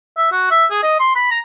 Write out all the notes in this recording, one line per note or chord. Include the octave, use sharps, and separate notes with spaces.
E5
F#4
E5
G#4
D#5
C6
B5
A#5